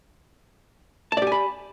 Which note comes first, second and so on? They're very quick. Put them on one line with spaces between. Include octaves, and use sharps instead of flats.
A5 D5 G4 G#5 B5